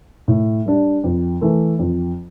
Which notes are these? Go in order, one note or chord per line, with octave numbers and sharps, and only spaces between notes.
A2
G3 D4
F2
E3 A3
F2